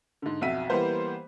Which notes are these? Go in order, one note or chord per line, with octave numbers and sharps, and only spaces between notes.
G#2 D3
B1 F2 F#4 E5 B6 D#7
E3 G3 A#3 B3 B4 C5